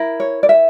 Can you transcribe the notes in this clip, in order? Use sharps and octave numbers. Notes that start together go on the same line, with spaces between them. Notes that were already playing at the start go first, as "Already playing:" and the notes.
Already playing: E4 A#4
C#5
D5
E5